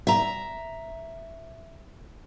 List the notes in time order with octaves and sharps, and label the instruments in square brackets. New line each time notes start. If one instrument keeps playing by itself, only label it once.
[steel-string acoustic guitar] E5 A#5